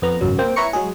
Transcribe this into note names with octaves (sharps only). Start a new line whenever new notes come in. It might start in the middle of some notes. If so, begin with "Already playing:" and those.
F2 B3 A#5
G#1 C#2 F#2 F#3
A#3 C4 G5
E4 B4 C#5 A#5 C#6 C#7
F#3 G#3 G#4